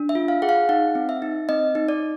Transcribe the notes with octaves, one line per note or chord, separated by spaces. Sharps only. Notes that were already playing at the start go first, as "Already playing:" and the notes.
Already playing: D4
E5
F4
F5
G#4 F#5
F5
D#4 F#5
C4
E5
D#4
C4 D#5
D#4
D5